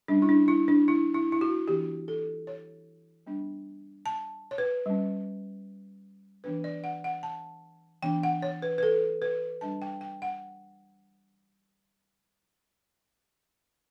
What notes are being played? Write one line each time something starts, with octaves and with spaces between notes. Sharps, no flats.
G3 C#4 D4
E4
D4
E4
D4
E4
E4
E4
F#4
E3 B3 D4 G4
A4
C#5
G3 B3 D4
A5
C#5
B4
G3 C#4
E3 B3 D4 B4
D5
F#5
F#5
A5
E3 B3 D4 G5
F#5
C#5
B4
B4
A4
B4
G3 D4 A5
G5
G5
F#5